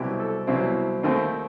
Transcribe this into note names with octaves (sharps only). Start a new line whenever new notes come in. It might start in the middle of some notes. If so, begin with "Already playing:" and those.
Already playing: C2 B2 F#3 C4 E4 G4
A4
C2 B2 F#3 C4 E4
D#2 D#3 A3 C4 D#4